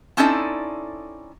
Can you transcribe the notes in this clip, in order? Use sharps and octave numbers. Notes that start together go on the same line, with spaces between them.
C4 C#4 D#4 E4 A4 D5